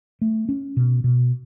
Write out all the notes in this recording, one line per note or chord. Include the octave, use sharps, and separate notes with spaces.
A3
C#4
B2
B2